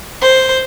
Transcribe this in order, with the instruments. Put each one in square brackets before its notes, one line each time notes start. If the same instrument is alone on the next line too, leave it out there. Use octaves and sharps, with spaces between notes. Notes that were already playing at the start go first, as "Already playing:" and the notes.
[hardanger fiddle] C5